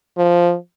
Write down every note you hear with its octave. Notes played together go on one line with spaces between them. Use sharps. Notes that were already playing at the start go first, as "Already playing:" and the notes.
F3